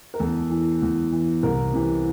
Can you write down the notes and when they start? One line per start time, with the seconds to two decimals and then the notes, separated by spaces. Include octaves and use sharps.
0.14 A#4
0.20 E2 A4
0.51 E3
0.82 E2
1.12 E3
1.43 C2 A#4
1.73 C3 E3